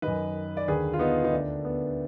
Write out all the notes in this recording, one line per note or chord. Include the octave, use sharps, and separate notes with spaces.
F#2 D#3 B4 D#5
D5
D#2 D3 G#4 B4
F4
B3 D#4
D#4
D2 D3 D4
B3